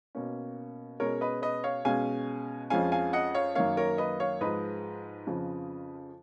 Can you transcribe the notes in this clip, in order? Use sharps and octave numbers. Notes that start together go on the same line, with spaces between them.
B2 A#3 C#4
B2 G#3 C#4 A#4 C#5
B4 D#5
B4 D#5
C#5 F5
B2 G#3 C#4 F5 G#5
F2 F3 G#3 C#4 F5 G#5
F5 G#5
D#5 F#5
C#5 F5
F#2 D#3 A#3 C#5 F5
A#4 C#5
B4 D#5
C#5 F5
G#2 F3 G#3 B4 D#5
F2 C#3 F3